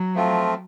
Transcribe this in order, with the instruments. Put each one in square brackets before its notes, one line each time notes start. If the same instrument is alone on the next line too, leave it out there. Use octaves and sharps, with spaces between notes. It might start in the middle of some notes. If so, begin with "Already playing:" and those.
Already playing: [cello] F#3
[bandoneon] F3 A3 C4 F4